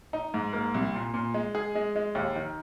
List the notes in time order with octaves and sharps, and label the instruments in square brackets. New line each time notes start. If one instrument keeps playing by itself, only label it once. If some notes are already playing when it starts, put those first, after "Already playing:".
[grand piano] D#4
G#2
A#3
C2
A#2
A#2
G#3
G#4
G#3
G#3
D#2
D#3